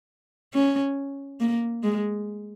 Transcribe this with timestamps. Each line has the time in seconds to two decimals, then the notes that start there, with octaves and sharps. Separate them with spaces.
0.54 C#4
1.40 A#3
1.83 G#3